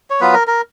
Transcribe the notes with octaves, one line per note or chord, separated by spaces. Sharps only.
C#5
F#3 B3 F4 B4
A#4
A#4